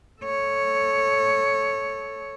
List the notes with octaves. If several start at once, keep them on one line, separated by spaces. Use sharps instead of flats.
A4 C#5